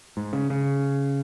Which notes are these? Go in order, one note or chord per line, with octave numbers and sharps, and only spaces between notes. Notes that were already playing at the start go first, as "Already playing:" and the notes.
G#2
C#3
C#3